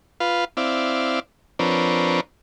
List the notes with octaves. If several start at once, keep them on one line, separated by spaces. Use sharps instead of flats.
F4 B4 F5
C4 E4 D5 F5
F3 C4 D4 A#4 B4 C#5